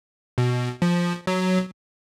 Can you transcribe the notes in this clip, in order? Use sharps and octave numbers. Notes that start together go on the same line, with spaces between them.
B2
F3
F#3